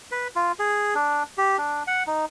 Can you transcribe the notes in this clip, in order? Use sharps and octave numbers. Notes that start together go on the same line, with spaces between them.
B4
F4
G#4
D4
G4
D4
F#5
D#4